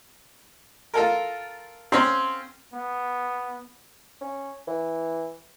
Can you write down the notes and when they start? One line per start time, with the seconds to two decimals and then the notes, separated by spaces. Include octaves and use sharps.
0.94 F4 A4 A#4
1.92 C4 C#4 C6
2.73 B3
4.21 C#4
4.68 E3